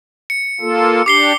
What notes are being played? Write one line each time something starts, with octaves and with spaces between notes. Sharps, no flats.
C#7
A#3 F4 A4
D4 G4 D6 C7 G7